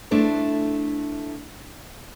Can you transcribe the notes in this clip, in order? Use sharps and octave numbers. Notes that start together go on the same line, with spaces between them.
A3 D4 E4 C5